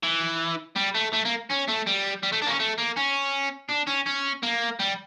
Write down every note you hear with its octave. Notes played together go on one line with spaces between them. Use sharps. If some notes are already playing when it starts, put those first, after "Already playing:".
E3
G3
A3
A3
A#3
C#4
A3
G3
G3
A3
D4
A#3
C#4
A3
A#3
C#4
D4
C#4
C#4
A#3
G3